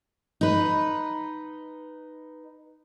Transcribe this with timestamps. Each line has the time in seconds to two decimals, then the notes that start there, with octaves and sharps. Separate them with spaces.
0.41 D#4 B4